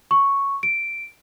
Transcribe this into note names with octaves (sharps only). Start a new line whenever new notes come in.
C#6
D7